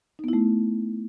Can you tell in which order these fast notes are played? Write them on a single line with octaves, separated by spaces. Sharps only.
D#4 B3 E4 A3